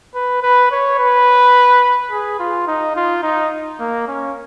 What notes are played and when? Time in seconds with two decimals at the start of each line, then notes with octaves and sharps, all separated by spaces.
0.15 B4
0.43 B4
0.71 C#5
0.99 B4
2.11 G#4
2.39 F4
2.67 D#4
2.96 F4
3.23 D#4
3.80 A#3
4.08 C#4